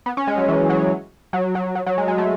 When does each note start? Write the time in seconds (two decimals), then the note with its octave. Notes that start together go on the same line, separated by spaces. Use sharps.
0.06 B3
0.17 C#4
0.27 G#3
0.38 F#3
0.48 E3
0.69 F#3
1.33 F#3
1.55 F#3
1.75 F#3
1.86 F#3
1.98 G#3
2.08 G#3
2.18 A3